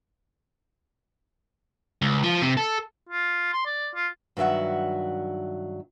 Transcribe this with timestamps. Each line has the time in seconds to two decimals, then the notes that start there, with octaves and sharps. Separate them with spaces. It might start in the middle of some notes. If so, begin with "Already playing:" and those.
2.02 C#2
2.23 F3
2.41 C3
2.57 A4
3.09 F4
3.53 C6
3.66 D5
3.95 F4
4.37 G2 D#3 F#3 E5 F#5